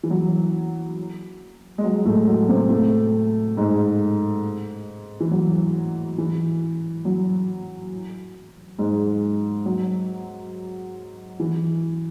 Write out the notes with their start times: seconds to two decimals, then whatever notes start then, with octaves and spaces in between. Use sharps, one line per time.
0.03 E3
0.10 F#3
1.78 G#3
1.83 F#3
2.05 A2 A3
2.27 F#3
2.49 C3 C4
2.70 A2 A3
3.57 G#2 G#3
5.20 E3
5.31 F#3
6.18 E3
7.05 F#3
8.79 G#2 G#3
9.66 F#3
11.40 E3